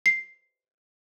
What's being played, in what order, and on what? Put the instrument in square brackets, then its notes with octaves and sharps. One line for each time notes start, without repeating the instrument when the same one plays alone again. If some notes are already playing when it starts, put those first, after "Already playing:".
[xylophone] C7